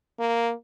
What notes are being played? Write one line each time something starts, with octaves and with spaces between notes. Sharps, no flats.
A#3